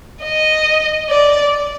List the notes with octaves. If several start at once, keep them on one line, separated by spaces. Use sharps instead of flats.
D#5
D5